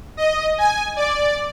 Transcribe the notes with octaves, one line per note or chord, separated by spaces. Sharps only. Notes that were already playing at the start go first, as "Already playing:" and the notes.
D#5
G#5
D5